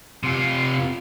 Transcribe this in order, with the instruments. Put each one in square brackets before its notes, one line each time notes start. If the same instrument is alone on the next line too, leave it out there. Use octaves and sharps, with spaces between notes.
[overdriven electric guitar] C3 F4